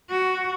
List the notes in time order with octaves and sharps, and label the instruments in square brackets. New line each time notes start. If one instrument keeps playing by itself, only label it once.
[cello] F#4